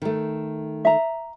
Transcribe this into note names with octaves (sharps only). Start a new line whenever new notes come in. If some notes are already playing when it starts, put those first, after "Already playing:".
D#3 A3
E5 A#5